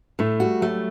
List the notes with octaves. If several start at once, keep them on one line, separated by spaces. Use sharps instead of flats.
A2 A3
G3 F#4
F#3 A3